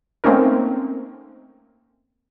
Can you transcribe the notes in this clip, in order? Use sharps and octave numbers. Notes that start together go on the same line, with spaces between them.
A3 A#3 C4 C#4 D#4 A#4